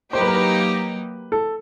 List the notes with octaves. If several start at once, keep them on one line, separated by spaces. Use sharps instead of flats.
F#3 A#3 D#4 G4 C5
B4
A#4
B4
A4